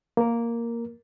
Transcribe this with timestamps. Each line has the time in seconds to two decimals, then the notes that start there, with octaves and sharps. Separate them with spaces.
0.17 A#3 A#4